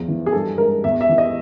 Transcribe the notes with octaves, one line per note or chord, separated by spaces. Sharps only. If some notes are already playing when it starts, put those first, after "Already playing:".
Already playing: E2 F3
E3
G#4
G2 A4
G#3 A#4
E2 E5
E5
E3
D#5